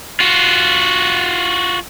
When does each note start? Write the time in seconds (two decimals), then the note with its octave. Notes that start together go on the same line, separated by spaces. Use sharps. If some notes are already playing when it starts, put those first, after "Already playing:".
0.20 F4 F#4